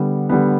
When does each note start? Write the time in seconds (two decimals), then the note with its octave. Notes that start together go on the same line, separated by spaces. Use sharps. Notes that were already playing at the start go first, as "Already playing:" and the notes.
Already playing: D3 G3 B3
0.29 D3 G3 B3